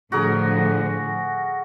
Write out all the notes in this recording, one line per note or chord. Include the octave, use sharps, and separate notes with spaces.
A2 D3 F3 F#4 G#4 A#4